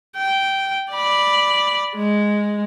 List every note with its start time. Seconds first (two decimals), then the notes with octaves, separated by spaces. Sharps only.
0.16 G5
0.92 D5 B5
1.96 G#3